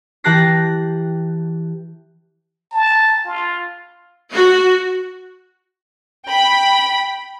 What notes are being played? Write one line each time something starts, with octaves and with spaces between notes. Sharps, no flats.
E3 G4 A5 F#6 A#6 C7
A5
F4
F#4
G5 B5